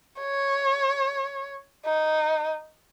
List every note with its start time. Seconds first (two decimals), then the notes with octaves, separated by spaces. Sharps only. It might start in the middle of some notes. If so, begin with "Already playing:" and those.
0.21 C#5
1.86 D#4